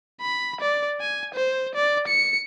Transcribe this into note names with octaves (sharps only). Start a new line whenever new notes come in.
B5
D5
G#5
C5
D5
C#7